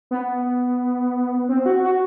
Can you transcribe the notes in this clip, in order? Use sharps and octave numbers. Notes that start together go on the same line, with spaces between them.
B3
C4
F#4
F#4